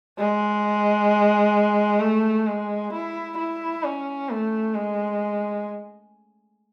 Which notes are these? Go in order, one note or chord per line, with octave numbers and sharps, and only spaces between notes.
G#3
A3
G#3
E4
E4
C#4
A3
G#3